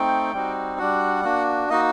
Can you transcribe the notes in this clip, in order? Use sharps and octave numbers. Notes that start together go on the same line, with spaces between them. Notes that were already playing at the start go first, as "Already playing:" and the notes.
Already playing: A3 C4 D#4 G5
G3 C4 D#4 F#4
G3 D4 F#4 F#5
A#3 D4 F#4
A#3 D#4 F#4 D#5